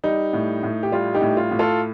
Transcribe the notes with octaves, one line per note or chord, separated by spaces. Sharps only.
G3 D#4
A2
A2
G4
G3 F4
D#4 G4
A2
F4
A2
F4 A4